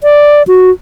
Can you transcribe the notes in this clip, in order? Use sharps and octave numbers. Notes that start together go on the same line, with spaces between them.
D5
F#4